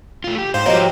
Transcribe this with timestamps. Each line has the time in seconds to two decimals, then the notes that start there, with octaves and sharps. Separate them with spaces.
0.24 A3 F4
0.38 G4
0.54 G#2 C5 F5
0.66 F3 A#3 F#4 G4 C#5 D#5